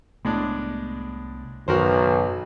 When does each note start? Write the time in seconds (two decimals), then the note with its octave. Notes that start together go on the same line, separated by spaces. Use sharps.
0.25 C2 A2 G#3 A3 B3 D4
1.68 F#1 B1 F#2 D#3 F#4 A#4 C5